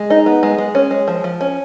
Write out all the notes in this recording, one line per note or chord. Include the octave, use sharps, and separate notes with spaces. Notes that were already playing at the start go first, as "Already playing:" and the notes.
Already playing: G#3
D#4
B3
G#3
G#3
C#4
G#3
F3
F3
C#4